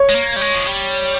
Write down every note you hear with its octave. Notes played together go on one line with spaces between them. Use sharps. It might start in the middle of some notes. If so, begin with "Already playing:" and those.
Already playing: C#5
G#3
A#3
G3
G#3
F3
G3